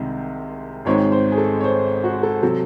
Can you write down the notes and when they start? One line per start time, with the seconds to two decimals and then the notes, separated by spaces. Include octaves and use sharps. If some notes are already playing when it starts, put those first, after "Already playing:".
Already playing: C2 C3 D#3 G#3 C4
0.85 G#1 G#2 D#3 G#3 C4 C#5
1.12 C5
1.32 G#4
1.38 A4
1.60 C#5
1.64 C5
2.04 F#4
2.23 A4
2.43 C3 F#3 C4 A4